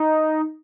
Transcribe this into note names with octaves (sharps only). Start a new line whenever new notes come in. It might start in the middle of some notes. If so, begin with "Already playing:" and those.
Already playing: D#4